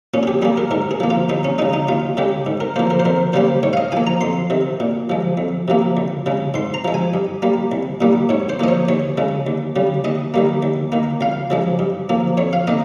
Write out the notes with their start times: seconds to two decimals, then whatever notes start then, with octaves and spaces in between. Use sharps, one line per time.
0.14 A#2 C#4
0.23 G#4
0.27 G4
0.42 G3 A#3 G#4
0.57 A#4
0.71 G#2 A#4
0.91 G#4
1.00 F3 A#3
1.10 F4
1.29 D#2 D#4
1.45 C#4
1.58 C#3 G#3 D#4
1.74 D#4
1.88 D#2 F4
2.17 C#3 G#3 G4
2.46 G#2
2.60 A#4
2.76 F3 A#3 C5
2.91 A#4
3.00 C5
3.05 F2 A#4
3.33 C#3 G3 A#3 C5
3.63 G#2 C#5
3.73 F5
3.77 D#5
3.92 F3 A#3 G#5
4.07 A#5
4.21 F2 C6
4.50 C3 D#3
4.80 A#2
5.10 F3 G#3
5.38 F2
5.68 C3 F3 A#3
5.97 C#2
6.26 C#3 G#3
6.54 G#2 C6
6.74 A#5
6.85 F3 G#3
6.94 G#5
7.14 G2
7.42 G3 A#3
7.72 C2
8.01 A#2 G3 A#3
8.29 G#2 C#5
8.49 C5
8.60 F3 A#3 D#5
8.68 C#5
8.89 D#2 C#5
9.18 C#3 G#3
9.47 D#2
9.76 C#3 G3
10.04 D#2 D#5
10.34 D#3 G3 A#3
10.63 D#2
10.92 D#3 A#3
11.21 C#2 F5
11.50 C#3 F3 G#3
11.79 G2
12.09 F3 A#3
12.37 F2 C#5
12.53 F5
12.67 D#3 A#3 D#5